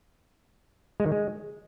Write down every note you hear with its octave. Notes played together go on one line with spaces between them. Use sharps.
G#3
D#3
G#3